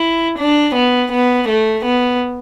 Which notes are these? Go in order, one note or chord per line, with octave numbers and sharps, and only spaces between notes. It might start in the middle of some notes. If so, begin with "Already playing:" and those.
Already playing: E4
D4
B3
B3
A3
B3